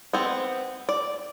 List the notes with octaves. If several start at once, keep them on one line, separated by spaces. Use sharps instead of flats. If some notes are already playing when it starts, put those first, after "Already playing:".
B3 C4
D5